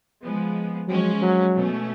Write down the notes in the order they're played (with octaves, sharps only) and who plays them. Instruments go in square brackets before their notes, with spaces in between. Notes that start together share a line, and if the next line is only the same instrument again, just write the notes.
[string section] F3 G#3 B3
[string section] F3 G#3 C#4 [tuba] F#3
[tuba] F#3
[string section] B2 A3 C#4